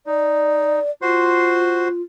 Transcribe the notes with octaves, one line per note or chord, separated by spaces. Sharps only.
D#4 D5
F4 F#4 C5 C6